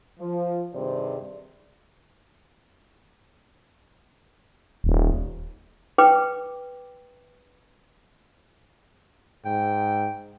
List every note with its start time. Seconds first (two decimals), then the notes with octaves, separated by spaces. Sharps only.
0.19 F3
0.73 G2 C3 D#3 G#4 C5 D5
4.84 D#1
5.98 B4 G5 D6
9.45 G#2 G5